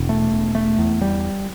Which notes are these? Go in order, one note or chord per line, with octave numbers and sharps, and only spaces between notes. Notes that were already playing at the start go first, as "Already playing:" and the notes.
Already playing: E1
A3
E1
A3
E2
G3